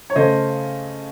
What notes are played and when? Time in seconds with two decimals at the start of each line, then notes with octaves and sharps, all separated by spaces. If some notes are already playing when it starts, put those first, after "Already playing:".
0.10 C#5
0.16 C#3 A3 C5 D#5